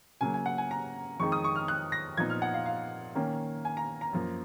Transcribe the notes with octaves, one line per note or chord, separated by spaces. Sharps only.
C#3 F#3 A#3 G#5
G#5
F#5
G#5
A#5
F2 D#3 G#3 D#4 C#6
D#6
C#6
F6
F#6
A#6
A#2 F3 B3 D#4 G#6
F6
F#5
F5
F5
D#3 A#3 C#4
G#5
A#5
A#5
F#2 F3 A#3